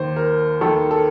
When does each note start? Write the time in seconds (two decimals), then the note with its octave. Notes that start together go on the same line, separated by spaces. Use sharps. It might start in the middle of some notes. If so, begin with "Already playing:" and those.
Already playing: D#2 D#3 C5
0.16 A#4
0.61 D#2 D#3 A4
0.91 A4